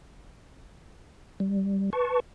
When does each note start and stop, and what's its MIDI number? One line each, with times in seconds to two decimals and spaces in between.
1.40 1.90 55
1.93 2.20 71
1.93 2.20 81
1.93 2.20 85